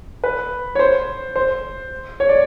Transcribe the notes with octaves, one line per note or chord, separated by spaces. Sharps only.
B4
C#5
C5
C5
C#5
D5